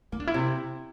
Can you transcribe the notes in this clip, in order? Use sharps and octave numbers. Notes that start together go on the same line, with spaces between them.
A#3 E4
D4
E4
C3